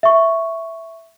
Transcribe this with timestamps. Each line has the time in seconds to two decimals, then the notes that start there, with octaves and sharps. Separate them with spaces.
0.03 E5 C#6